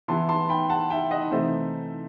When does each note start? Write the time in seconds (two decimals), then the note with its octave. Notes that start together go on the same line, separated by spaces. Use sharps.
0.08 E3 B3 E4 A5 C6
0.29 A5 C6
0.49 G5 B5
0.69 F#5 A5
0.90 E5 G5
1.11 D#5 F#5
1.31 C3 E3 A3 D#4 C5 E5